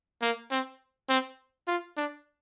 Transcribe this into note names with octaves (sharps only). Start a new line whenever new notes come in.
A#3
C4
C4
F4
D4